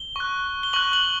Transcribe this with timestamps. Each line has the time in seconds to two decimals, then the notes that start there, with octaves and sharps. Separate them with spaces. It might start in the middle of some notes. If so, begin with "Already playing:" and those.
Already playing: G7
0.16 C#6 F#6
0.63 G7
0.73 C#6 F#6 F#7
0.93 F#7